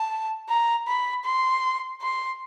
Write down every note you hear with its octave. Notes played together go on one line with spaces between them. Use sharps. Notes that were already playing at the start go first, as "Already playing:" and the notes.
Already playing: A5
A#5
B5
C6
C6